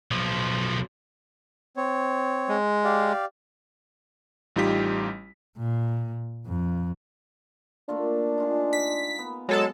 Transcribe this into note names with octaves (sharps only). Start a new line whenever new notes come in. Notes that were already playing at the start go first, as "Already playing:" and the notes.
B1 F3
C4 C#5
G#3
G4 D5 F5
A1 G3 D#4 F4 G4 B6
A#2
F2
A3 A#3 D4 F4
D#4 F4 G#4
B6
B3
F#3 G#3 A4 A5